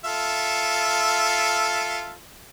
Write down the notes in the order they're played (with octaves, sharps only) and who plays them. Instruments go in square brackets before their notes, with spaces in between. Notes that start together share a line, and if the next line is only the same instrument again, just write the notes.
[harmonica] F4 A4 E5